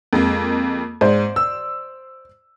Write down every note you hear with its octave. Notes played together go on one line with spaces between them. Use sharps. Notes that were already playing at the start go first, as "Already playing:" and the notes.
F2 G#3 A#3
G#2 C5 D5 C6
E6